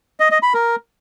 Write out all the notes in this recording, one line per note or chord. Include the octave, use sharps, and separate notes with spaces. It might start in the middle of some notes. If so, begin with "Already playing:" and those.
D#5
D#5
B5
A#4